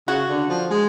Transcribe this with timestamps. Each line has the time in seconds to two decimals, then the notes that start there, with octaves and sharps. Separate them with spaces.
0.08 C#3 F#4
0.29 D3
0.49 F3
0.70 G#3